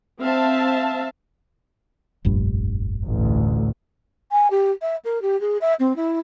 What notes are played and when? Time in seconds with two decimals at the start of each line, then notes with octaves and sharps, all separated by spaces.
0.20 C4 E5 F5 A5
2.25 F1 A#1 G2
3.05 A1 D2
4.31 G#5
4.50 G4
4.81 E5
5.04 A#4
5.21 G4
5.40 G#4
5.61 E5
5.79 C4
5.96 E4